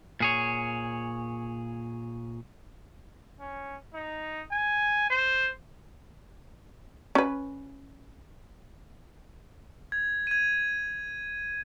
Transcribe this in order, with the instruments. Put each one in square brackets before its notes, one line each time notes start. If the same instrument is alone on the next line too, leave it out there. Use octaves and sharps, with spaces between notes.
[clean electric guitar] A#2 G#4 C#5
[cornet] C#4
D#4
G#5
C5
[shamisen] C#4 B4
[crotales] G#6
G#6 D#7